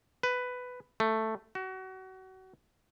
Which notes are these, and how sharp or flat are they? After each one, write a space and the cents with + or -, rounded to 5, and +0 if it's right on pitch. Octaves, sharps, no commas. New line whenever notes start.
B4 +10
A3 +5
F#4 +30